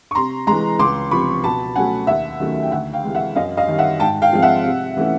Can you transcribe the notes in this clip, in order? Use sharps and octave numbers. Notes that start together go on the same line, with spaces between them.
C#6
C3 A#5 C6
E3 G#3 A#5 C6
C#2 C6 D6
C3 F3 B5 C#6
B2 A5 B5
F#3 A3 C#4 F#5 G#5
D#2 E5 F#5
D#3 F#3 A3 C#4
G5
D2 E5 F#5
F5 G5
C3 E3 G#3
E5 F#5
F#2 D#5 F5
D#5 F5
D#3 G3
E5 F#5
G#2 G5 A5
F5 G5
F3 G#3 C4
E5 F#5
C3
E3 A3 C#4